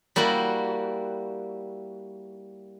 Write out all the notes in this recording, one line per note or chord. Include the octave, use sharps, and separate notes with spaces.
G3 A#3 E4 F#4